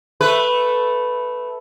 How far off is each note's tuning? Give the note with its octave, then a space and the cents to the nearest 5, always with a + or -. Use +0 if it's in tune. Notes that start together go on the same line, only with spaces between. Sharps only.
A3 -5 B4 +0